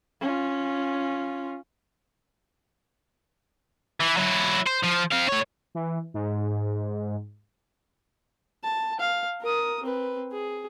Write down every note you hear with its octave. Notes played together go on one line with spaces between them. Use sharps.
C#4 F4
E3
F#3 E4
C5
F3
C4 F5
A2 C#5
E3
G#2
A5
F5
A#4 D#6
C4 B4
G#4